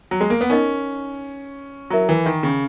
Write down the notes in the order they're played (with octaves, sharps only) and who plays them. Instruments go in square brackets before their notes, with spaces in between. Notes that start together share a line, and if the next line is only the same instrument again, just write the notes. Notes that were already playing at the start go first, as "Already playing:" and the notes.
[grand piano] F#3
G#3
A#3
B3
[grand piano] C#4 [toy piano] D#4 A#4 D#5
[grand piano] F#3 [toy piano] E4 A#4 E5 A#5 C#6
[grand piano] E3
D#3
C#3